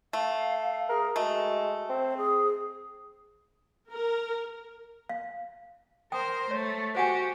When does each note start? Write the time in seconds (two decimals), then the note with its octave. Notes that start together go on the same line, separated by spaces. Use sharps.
0.13 A3 F5
0.89 G#4 A#4
1.16 G#3 A3 F#4
1.89 C4 C5
2.17 G#4
3.90 A#4
5.09 F5
6.12 A#4 C5 G5 D#6
6.51 A3 C#5
6.95 F#4 G4 C5 F#5 G#5